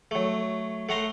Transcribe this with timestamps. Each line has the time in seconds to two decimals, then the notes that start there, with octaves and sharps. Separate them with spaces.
0.11 F#3 A3
0.89 A3 F#5 A#5 C6